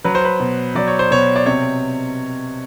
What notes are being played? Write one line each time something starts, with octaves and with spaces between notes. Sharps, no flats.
F#3 B4
C5
B4
B2
F#3 D5
C#5
C5
B2 C#5
D5
C3 C#5